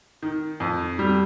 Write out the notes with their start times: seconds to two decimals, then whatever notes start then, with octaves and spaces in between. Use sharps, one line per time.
0.22 D#3
0.60 F2
0.99 G3